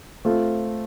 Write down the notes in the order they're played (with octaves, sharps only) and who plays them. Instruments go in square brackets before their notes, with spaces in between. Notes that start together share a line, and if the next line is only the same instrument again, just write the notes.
[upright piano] A3 C4 F4